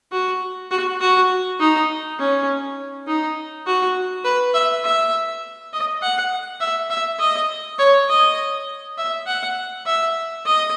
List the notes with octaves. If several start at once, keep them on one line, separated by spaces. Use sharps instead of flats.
F#4
F#4
F#4
D#4
C#4
D#4
F#4
B4
E5
E5
D#5
F#5
E5
E5
D#5
C#5
D#5
E5
F#5
E5
D#5